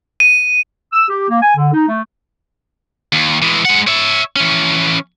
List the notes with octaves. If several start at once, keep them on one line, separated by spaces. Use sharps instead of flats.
D#7
E6
G4
A#3
G#5
D3
D#4
A3
D#2
E3 G#3
G#3 F#5
C#5 E5
E3 C#4